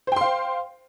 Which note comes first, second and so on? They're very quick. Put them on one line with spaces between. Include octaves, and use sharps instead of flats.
C5 G5 C6 F5